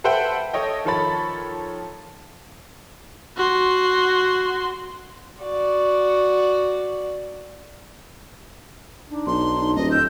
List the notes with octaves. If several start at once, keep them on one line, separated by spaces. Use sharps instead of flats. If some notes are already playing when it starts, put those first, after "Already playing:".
A4 B4 C5 E5 F#5 G5
A4 C#5 D#5 G5
D#3 F3 A4 C#5 B5 A6
F#4 C6
F#4 D5
D4 D#4
B1 C6
D#1 D#5
F2 E6 G6